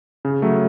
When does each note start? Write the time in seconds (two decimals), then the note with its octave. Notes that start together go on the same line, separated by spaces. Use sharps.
0.25 C#3
0.42 F#3 A3